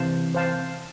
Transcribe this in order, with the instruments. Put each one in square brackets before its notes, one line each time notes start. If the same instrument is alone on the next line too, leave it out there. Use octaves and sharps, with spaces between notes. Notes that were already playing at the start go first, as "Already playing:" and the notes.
Already playing: [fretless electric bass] C3 E3 [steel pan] C5 F5 A5
[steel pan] C5 F5 A5